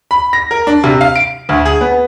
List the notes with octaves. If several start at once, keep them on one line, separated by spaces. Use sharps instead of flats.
B5
A#6
A#4
D4
C3
F5
D7
D2
G#4
B3